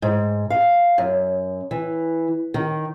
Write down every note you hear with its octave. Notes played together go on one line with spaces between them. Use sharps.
G#2
F5
F#2
E3
D#3